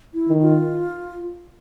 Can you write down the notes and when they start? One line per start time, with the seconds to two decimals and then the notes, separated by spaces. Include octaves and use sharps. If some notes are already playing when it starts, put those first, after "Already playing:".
0.14 E4
0.28 D#3
0.42 F4